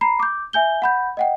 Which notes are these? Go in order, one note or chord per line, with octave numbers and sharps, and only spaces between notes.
A#5 B5 C7
D6 G6
E5 G#5 G6 G7
F#5 B5 G6
D#5 F#5 G5